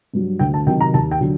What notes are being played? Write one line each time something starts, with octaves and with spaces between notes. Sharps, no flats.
G2 F#3
D2 G5
A5
C3 D#3 F#3 G5
A#5
D#2 A5
G5
D3 F#3